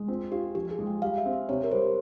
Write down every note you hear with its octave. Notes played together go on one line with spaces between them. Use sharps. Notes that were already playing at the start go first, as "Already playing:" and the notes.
Already playing: G#3
C4 F4
F4 G4
F3 G4
G4
G#4
G#3
G5
G3 F5
E5
C4
E5
C3 C#5
A#4
G3 C5